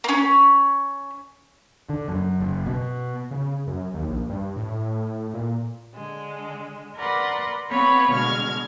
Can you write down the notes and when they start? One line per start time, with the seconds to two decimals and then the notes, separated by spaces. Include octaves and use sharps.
0.04 A#3 C#4
1.89 D3
2.08 F#2
2.40 F#1
2.66 B2
3.31 C#3
3.67 F#2
3.94 D#2
4.08 A#1
4.29 G2
4.56 A2
5.34 A#2
5.94 D3 G#3
6.97 A#4 B4 D5 F#5 C6
7.70 B3 C4 B4 C#5 F5 B5
8.12 B2 D3 G#3 F6 G#6